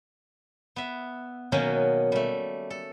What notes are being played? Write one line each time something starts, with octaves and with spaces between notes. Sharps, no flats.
B3 E5
B2 D#3 F#3 A#3 C#4
G3 A3
A4